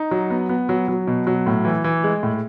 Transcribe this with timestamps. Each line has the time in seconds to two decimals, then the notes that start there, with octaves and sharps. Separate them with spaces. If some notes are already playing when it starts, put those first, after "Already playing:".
Already playing: D#4
0.11 F#3
0.30 B3
0.49 B3
0.69 F#3
0.88 F#3
1.07 B2
1.27 F#3
1.47 A2
1.65 E3
1.84 E3
2.04 G#3
2.23 A2